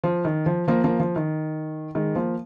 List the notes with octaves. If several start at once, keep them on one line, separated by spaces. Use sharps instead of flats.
F3
D#3
F3
F3 A#3
F3 A#3
F3
D#3
D#3 G#3
F3 A#3